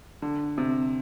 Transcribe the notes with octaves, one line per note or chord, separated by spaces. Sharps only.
D3
C3